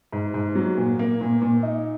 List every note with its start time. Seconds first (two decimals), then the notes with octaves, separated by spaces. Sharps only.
0.13 G#2
0.34 G#2
0.55 F#3
0.77 A#2
0.99 A#3
1.21 A#2
1.42 A#2
1.63 D#4